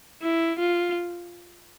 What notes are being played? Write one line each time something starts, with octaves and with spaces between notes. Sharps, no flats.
E4
F4